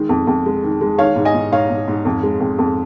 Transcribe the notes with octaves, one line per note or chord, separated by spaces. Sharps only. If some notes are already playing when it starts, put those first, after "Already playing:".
Already playing: D#3 G#3
F2
F2
G#3
D#3
G#3
D#3 C#5 F5
G#2
D#5 G#5
G#2
G#2 C#5 F5
G#2
G#2
F2
G#3
F2
F2